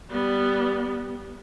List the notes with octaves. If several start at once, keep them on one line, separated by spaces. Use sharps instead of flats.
G3 B3